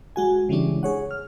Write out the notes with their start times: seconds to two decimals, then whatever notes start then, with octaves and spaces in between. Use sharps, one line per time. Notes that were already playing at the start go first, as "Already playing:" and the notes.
0.16 G#3 F#4 G#5
0.49 C#3 E3 G3 G#3 C#4 D4
0.83 G#4 C#5 F#5
1.11 F6